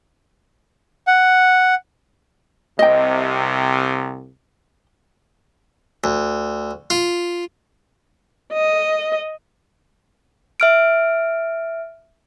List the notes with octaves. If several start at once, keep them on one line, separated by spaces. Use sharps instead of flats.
F#5
C2 C3 D#5 G5
D2
F4
D#5
E5 F6 D7